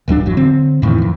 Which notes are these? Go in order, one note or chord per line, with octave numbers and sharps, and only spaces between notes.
D#1 D#2 F#3 D4
G#1 E2 F#3
D3 C4
F2 A2 D#3 E3
F2